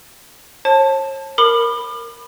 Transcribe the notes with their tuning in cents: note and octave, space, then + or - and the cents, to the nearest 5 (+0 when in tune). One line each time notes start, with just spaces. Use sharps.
C#5 -45 A5 +0
A#4 +0 B5 +0 D6 +40